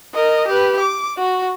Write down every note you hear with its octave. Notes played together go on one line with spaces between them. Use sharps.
A#4 D#5
G4 B4
D6
F#4